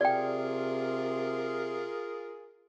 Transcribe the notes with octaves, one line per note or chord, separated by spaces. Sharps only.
C3 F4 G#4 A#4 D5 G5